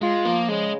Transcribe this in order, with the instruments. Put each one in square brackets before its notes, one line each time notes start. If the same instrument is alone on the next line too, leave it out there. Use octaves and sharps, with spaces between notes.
[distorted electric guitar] G#3 [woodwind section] F4
[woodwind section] F3 [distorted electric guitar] A#3
[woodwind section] C#3 [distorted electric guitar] G#3